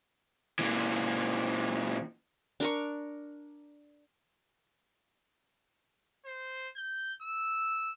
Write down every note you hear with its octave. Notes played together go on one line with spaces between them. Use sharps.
A#2 E3
D4 A#4 C#6
C5
G6
E6